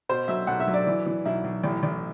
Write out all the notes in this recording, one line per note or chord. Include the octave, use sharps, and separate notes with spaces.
B2 C5
F#3 E5
B1 F#5
E5
F#3
D5
E3
E3
B1 E4
B1
A1
A1